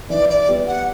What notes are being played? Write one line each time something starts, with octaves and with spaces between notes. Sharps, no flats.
E3 D5
D5
G3 B3
F#5